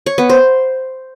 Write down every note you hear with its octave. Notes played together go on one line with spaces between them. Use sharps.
C#5
B3
C5